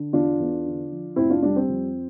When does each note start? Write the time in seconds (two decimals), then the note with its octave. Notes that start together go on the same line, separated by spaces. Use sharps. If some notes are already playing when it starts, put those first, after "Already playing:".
Already playing: D3
0.13 E2 D4 F4
0.40 E2
0.65 D3
0.91 F3
1.16 F1 C4 E4
1.30 D4 F4
1.43 G3 D4
1.56 C4
1.69 F2